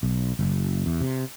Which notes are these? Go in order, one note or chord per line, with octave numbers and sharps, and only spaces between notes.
B1
F#1
E2
C3